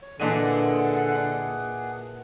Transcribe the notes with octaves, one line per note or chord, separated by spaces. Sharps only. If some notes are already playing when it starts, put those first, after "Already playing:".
C#5
A#2 D3 E3 D4 G#4 D#5 F#5 D#7